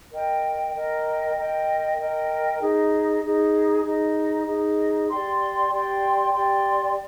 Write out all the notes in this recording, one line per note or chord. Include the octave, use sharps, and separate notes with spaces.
A#4 D#5 G5
A#4 D#5 G5
A#4 D#5 G5
A#4 D#5 G5
D#4 G#4 D#5
D#4 G#4 D#5
D#4 G#4 D#5
D#4 G#4 D#5
G4 D5 G5 C6
G4 D5 G5 C6
G4 D5 G5 C6